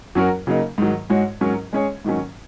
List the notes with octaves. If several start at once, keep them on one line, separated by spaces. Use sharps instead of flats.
F#2 F#3 C#4 F#4 A#4
C#3 F#3 A#3 D#4
G#2 D#3 F#3
G#2 G#3 F#4 C#5
G#2 F#3 C#4 A#4
G#3 C#4 G#4 C#5
G#2 D#3 F#3 C#4